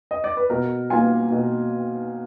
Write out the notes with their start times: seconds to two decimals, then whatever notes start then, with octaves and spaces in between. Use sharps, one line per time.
0.11 D#5
0.24 D5
0.37 B4
0.50 B2 A#4
0.90 A#3 F4 G#5
1.32 B2